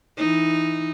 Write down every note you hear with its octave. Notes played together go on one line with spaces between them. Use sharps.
E3 D#4